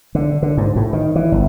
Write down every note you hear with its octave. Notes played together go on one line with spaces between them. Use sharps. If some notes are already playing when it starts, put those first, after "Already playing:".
D3
D3
G#2
A2
D#3
E3
G1